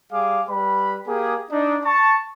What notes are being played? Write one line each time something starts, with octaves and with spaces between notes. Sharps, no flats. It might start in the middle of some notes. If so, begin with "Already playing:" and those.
G3 G#4 F5 D6
G3 B4 B5
A#3 G4 G#4
D4 D#4
A5 C#6